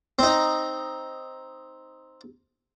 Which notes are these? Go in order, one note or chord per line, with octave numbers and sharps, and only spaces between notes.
C4 D#4